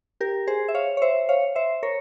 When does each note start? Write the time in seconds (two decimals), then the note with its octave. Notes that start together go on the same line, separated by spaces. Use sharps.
0.21 G4 A#4
0.47 G#4 C5
0.68 E5
0.75 C#5 F5
0.97 C#5
1.02 C5 E5
1.29 C#5 F5
1.56 C5 E5
1.83 A#4 C#5